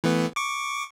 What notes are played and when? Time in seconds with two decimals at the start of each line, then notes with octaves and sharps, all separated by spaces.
0.04 E3 A3 B3
0.36 C#6 D6